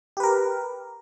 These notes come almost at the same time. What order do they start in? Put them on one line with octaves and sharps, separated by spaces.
G4 B4 A#4